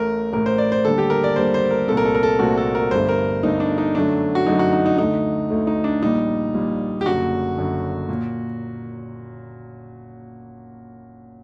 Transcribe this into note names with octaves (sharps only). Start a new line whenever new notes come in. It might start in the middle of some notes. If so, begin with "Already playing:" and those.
Already playing: A1 A2 A3 A#4
A1 A2 A3 A#4
C5
D5
C5
D#2 D3 G3 A4
G4
A#4
D5
D#2 D3 G3 C5
C5
A#4
C2 A#2 A3 C4 A4
A#4
A4
A#4
A4
C2 A#2 A3 C4 F#4
A4
A#4
G1 G2 D3 A3 C5
A#4
G1 G2 D3 A3 D#4
D4
D#4
F#2 D3 F#3 A3 D4
F#4
F#2 D3 F#3 A3 D#4
F#4
D#4
D#4
D2 D3 A3 D#4
D2 D3 A3
D#4
D4
A#1 A#2 G3 D#4
A#1 A#2 G3
G4
F#1 F#2 D3 F#4
F#1 F#2 D3
A#2